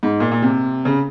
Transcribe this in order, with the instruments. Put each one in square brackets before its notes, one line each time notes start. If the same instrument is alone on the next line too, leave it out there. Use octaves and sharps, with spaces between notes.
[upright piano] G#2
A#2
A#2
C3
C#3